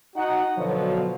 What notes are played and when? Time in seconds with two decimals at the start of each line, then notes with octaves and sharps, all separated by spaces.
0.16 D#4 F#4 F#5
0.57 B2 D3 F3 F#3